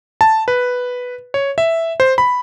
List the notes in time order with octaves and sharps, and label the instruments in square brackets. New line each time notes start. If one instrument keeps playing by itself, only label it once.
[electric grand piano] A5
B4
C#5
E5
C5
B5